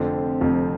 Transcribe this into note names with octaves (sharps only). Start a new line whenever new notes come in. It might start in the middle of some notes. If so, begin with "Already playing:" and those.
Already playing: F1 F2 D3 F3 C4
F1 F2 D3 F3 C4